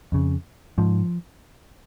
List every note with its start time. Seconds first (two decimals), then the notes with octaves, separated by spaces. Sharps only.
0.12 F2 C#3
0.78 G#2 F3